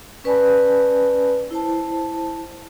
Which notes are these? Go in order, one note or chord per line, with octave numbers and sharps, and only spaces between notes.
C#4 B4 D5 G#5 A5 B5
E4 C5 A5